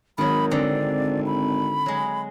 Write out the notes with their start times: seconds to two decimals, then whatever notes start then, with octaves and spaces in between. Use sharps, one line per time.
0.18 G#1 D#3 F#3 B5
0.51 D3 C4 D5 A#5
1.26 B5
1.86 F#3 G#3